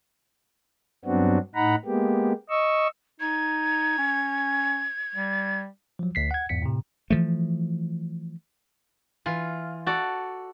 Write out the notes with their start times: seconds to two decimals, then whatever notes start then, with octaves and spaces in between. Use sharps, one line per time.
1.05 G2 F#3 B3 C4 D4 F#4
1.55 A2 D#4 F#5 A#5 B5
1.85 G#3 A#3 B3 G4
2.49 D#5 C#6 E6
3.20 D#4 G#6
3.98 C#4
5.15 G3
5.99 F3 F#3
6.15 D2 B6 C7
6.31 F#5 G#6
6.49 E2 G#2 B6 C#7
6.62 A2 C3
7.10 E3 F3 A3
9.26 E3 F4
9.86 F#4 A4 D5